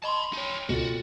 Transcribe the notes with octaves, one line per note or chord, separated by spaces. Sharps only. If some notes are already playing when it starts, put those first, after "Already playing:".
D#5 A5 B5 C6
D#4 C#5
C#2 B2 F4 F#4 A4